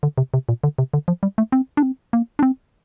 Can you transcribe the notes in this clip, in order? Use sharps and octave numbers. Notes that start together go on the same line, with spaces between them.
D3
C3
C3
A#2
D3
C3
D3
F3
G3
A3
C4
D4
C4
A#3
D4
C4